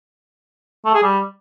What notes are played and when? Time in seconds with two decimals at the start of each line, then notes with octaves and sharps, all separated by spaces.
0.85 A3
0.94 G#4
1.03 G3